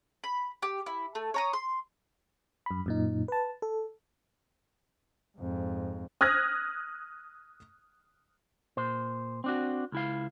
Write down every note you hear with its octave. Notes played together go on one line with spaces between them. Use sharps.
B5
G4
E4
A3
C#5 A#5 D#6
C6
F#2 B5
F#2 A#2 D#4
B4 A5
A4
F2 G#2
D#6 F6 F#6 G#6 A#6
A#2 C5
C4 D4 F#4
C#2 E4 F5